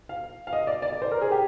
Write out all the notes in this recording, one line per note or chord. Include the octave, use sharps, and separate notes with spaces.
F5
F5
D#5
D5
D5
D5
C5
A#4
G#4
G4